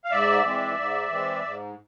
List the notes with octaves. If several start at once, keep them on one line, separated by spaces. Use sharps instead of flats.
F5
G#2 D5 E5
E3 G#3 C4
G#2
E3 G#3 C4
G#2